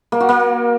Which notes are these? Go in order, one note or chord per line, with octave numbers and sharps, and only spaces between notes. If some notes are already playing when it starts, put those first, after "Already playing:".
A#3
F#4
A#3